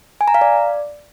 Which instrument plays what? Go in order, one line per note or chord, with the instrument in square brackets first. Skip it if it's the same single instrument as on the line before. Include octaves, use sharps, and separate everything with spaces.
[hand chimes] G#5
A#5
F5
D5